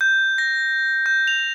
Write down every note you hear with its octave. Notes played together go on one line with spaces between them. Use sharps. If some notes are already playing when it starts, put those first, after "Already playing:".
G6
A#6
G6
F7